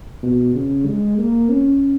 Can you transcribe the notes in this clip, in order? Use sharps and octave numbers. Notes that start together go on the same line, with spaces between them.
B2
C#3
G#3
A#3
C#4